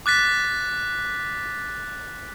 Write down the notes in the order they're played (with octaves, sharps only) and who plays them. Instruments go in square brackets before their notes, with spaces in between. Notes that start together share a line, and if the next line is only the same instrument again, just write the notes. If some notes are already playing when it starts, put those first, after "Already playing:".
[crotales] D6 F#6 A6 B6